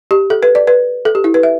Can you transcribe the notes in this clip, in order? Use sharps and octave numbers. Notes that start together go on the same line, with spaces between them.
G4
A4
B4
D5
B4
A4
G4
E4
B4
E5